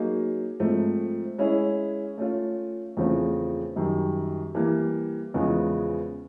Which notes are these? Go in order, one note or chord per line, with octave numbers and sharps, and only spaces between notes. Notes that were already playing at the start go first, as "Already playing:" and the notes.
Already playing: F#3 A#3 D#4 G#4
G#2 F3 A3 C4
G#3 C#4 E4 G#4
A3 C#4 F4
E2 C#3 F3 A3 C4
F#2 D#3 G3
E3 G3 A#3
E2 C#3 F3 G#3 B3